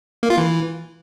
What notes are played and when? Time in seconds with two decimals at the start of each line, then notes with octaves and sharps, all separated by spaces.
0.23 A#3
0.30 F4
0.38 E3